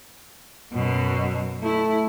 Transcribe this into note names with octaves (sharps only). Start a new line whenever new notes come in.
F#2 B2
A3 E4